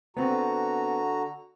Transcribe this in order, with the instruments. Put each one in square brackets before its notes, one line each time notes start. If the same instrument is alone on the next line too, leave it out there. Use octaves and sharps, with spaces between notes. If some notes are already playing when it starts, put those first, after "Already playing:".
[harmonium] D3 F#4 A#5 [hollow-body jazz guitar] B3 C4 C5